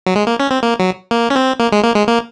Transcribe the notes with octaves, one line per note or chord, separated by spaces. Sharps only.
F#3
G#3
A#3
C#4
C4
A#3
F#3
A#3
C#4
C4
A#3
G#3
A#3
G#3
A#3